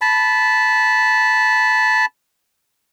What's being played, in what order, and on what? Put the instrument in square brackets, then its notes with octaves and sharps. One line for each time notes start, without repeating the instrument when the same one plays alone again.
[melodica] A5 B5